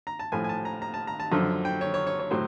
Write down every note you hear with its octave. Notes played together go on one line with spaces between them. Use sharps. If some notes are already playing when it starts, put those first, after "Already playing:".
A#5
A5
A2 F3 A3 G#5
G#5
A5
A#5
A#5
A5
A#5
A5
F#2 D3 F3
G5
C#5
C#5
C#5
C#5
A2 F#3 C5